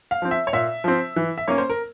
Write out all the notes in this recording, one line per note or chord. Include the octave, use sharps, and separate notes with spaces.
F5
F3 C4
E5
C#5
A#2 E5
F3 C4
E3
E5
A#3 C#4 C#5
C5
A#4